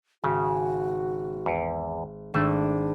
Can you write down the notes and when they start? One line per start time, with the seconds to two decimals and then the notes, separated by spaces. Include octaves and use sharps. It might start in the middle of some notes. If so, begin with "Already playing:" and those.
0.24 G#1 C#3 F#4
1.46 E2
2.34 G#1 A3 D4 E7